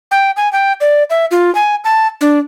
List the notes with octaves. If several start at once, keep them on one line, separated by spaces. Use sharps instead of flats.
G5
G#5
G5
D5
E5
F4
G#5
A5
D4